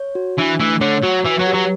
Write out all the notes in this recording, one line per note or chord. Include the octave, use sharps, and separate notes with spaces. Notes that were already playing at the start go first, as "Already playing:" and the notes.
Already playing: C#5
F#4
E3 D4
E3 A3
D3 C#5
F#3 F#4
E3 B4
F#3
G4
F#3